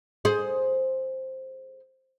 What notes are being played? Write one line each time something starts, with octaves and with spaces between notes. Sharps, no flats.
G#4 C5